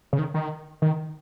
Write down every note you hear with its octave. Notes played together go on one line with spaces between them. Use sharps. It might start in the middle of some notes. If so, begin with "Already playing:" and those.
C#3
D#3
D#3
D#3